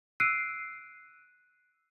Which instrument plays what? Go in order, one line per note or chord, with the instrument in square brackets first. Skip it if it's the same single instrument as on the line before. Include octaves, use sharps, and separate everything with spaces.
[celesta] E6 F#6 C7 D7 D#7